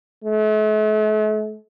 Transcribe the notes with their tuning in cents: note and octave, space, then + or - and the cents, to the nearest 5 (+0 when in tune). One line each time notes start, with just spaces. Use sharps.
A3 -45